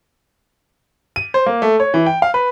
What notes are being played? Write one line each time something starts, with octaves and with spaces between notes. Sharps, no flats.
D#7
C5
A#3
A3
C#5
E3
G5
F5
B4